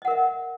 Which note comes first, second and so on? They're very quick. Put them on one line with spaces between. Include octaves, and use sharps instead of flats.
D#5 F#5 A#4 E5